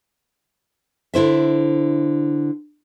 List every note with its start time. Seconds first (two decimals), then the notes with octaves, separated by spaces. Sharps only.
1.14 D3 E4 C5 E5